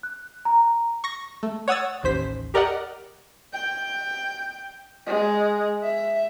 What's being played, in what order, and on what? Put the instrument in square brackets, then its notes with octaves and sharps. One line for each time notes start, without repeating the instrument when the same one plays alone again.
[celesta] F#6
A#5
[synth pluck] C#6 A#6
A3
C#5 F#5 D#6 E6 A6
A1 D#2 C5 B6
G4 A#4 D5 D#5 F#5
[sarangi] G5
G#3
E5